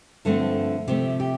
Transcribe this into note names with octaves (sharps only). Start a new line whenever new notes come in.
G2 D3 F3 A3 C4 A4
C3 F3 A3 G4
G4